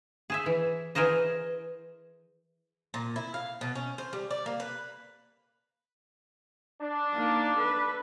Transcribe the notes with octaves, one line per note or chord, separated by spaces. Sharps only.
G#4 C5 E5
E3
E3 G#4 A#4 C5 D#5
A#2
E4
F5
B2
C#4
C5
G3
D5
A#3
B4
D4
A#3 D#4
A4 B4